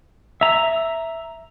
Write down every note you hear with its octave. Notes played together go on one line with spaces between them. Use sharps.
E5 A#5